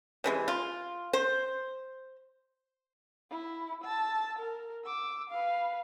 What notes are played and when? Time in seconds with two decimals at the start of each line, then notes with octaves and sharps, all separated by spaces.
0.24 C3 E3 G#3
0.48 F4
1.13 C5
3.30 E4
3.82 A5 E6
4.39 A#4
4.85 D6 E6
5.30 B4 F5